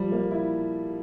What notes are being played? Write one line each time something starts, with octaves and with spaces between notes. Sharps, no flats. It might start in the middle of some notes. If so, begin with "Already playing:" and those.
Already playing: F3 G3
A#3
E4